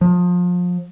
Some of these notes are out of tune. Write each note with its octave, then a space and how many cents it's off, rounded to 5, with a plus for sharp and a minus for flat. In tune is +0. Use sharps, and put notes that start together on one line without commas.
F3 +30